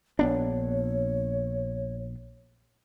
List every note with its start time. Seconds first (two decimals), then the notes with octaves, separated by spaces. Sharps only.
0.19 A#1 B3 D4 C#5